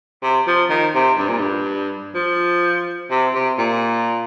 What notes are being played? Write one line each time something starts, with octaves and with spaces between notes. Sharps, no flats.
C3
F3
D#3
C3
G2
A#2
G2
F3
C3
C3
A#2